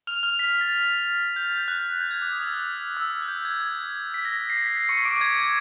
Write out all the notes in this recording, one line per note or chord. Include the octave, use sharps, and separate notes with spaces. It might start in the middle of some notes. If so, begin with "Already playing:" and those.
F6 F7
F6 F7
B6
B6
A6
G6
G6
F#6
G6
G#6
D6
D#6
E6
F6
E6
F#6
G6
G#6
G#6
B6
A#6
C7
B6
C7
C#6 C#7
D6 D7
G#6